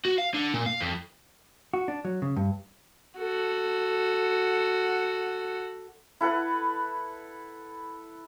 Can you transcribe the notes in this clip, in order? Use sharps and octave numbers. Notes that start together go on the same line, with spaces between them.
F#4
F5
D3
A#2
F5
F2
F#4
D4
F#3
C#3
G2
F#4 A4
E4 A4 B4 F#5